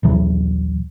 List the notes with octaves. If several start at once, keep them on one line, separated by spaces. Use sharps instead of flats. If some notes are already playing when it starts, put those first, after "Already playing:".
A#1 D#2 E3 F#3